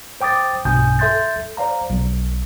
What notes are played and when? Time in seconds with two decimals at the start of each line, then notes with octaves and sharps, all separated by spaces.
0.21 C5 G5 D6 D#6 A6
0.65 B1 G2 B2 G#5 D#6 G6
0.99 A4 E5 C6 G6 A6
1.57 C5 D5 F5 A#5
1.90 B1